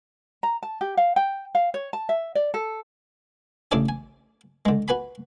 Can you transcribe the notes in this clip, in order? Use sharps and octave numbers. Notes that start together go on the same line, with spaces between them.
A#5
A5
G4
F5
G5
F5
C#5
A5
E5
D5
A4
A1 C#3 D4 A4 D5 G#5
G#5
D3 G#3
F#4 B4 G#5 B5